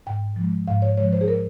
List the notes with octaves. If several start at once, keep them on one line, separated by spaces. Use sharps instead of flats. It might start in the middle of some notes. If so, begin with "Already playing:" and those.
G#2 G5
F3 G#3
G#2 F5
C#5
F3 G#3 C#5
C5
G#4
A#4